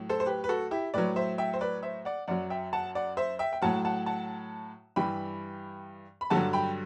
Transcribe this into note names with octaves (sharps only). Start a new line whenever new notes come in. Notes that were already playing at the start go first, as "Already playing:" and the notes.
Already playing: A2 F#3
A4 C5
C5
G4 B4
B4
F#4 A4
E4 G4
A2 F#3 B4 D5
C5 E5
E5 G5
C5
B4 D5
C5 E5
D5 F#5
F#2 F#3 D5 F#5
E5 G5
F#5 A5
D5 F#5
C5 E5
E5 G5
G5
A2 F#3 F#5 A5
F#5 A5
F#5 A5
G2 E3 G3 G5 B5
B5
G2 D3 F#3 F#5 A5
G5 B5